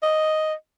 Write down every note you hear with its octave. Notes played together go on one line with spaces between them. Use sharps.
D#5